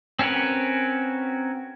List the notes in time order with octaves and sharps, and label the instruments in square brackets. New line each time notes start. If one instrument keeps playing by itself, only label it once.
[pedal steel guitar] C4 C#4 F#4 A#4 B4